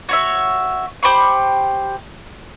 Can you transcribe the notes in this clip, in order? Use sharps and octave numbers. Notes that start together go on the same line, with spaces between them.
F#4 C#5 E5
G4 C5 B5 C#6